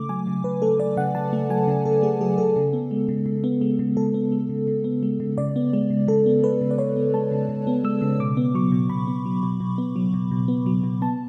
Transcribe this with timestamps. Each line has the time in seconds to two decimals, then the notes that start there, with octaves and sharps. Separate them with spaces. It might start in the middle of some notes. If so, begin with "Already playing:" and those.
Already playing: C#3 A3 D6
0.09 F#3 G#5
0.27 C#3
0.44 C#3 B4
0.62 A3 A4
0.79 F#3 D5
0.97 C#3 F#5
1.15 C#3 A5
1.33 A3
1.50 F#3 G#5
1.67 C#3
1.85 C#3 A4
2.03 A3 G#4
2.20 F#3 G#4
2.38 C#3 A4
2.56 C#3
2.73 B3
2.91 G#3
3.09 C#3
3.26 C#3
3.44 B3
3.61 G#3
3.79 C#3
3.97 C#3 A4
4.14 B3
4.32 G#3
4.49 C#3
4.67 C#3
4.84 B3
5.03 G#3
5.20 C#3
5.38 C#3 D5
5.56 B3
5.73 G#3
5.90 C#3
6.08 C#3 A4
6.26 B3
6.43 G#3 B4
6.61 C#3
6.71 D5
6.78 C#3 C#5
6.96 B3
7.14 G#3 A5
7.31 C#3
7.49 C#3
7.67 B3
7.84 G#3 E6
8.02 C#3
8.20 B2 D6
8.37 B3
8.54 F#3 C#6
8.72 B2
8.90 B2 B5
9.07 B3
9.26 F#3
9.43 B2
9.60 B2
9.78 B3
9.96 F#3
10.14 B2
10.31 B2
10.48 B3
10.66 F#3
10.84 B2
11.02 B3 A5